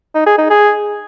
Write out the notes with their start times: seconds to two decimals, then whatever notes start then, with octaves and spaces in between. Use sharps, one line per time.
0.15 D#4
0.26 G#4
0.38 D#4
0.50 G#4